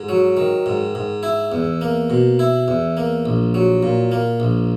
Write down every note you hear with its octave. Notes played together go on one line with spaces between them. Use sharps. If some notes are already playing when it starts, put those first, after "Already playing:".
Already playing: G#2
F#3
D#3
G#2
G#2
E4
E2
A#3
B2
E4
E2
A#3
A#1
F#3
A#2
A#3
A#1